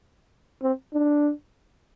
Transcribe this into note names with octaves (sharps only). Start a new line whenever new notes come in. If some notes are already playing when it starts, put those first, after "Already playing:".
C4
D4